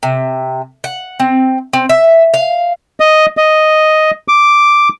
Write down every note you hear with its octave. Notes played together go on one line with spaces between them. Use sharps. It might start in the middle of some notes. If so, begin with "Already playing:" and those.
C3
F#5
C4
C4
E5
F5
D#5
D#5
D6